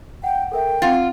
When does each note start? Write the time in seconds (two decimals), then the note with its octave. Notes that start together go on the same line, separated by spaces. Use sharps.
0.24 F#5 G5
0.52 A4 A#4 E5 G5
0.82 C4 F4 F#5 A6